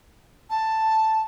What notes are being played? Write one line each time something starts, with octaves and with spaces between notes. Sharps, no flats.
A5